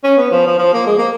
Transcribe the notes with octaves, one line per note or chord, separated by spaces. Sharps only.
C#4
B3
F3
F3
F3
A#3
G#3
A#3